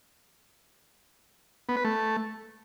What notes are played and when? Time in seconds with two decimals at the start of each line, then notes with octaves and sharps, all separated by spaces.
1.69 B3
1.77 B4
1.85 A3